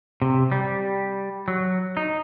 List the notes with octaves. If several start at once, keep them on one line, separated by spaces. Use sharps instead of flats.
C3
G3
F#3
D#4